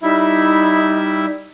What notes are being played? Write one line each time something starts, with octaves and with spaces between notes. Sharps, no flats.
G3 D#4 E4 E5